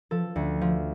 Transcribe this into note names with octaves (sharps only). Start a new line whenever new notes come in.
F3 A4
D2
F3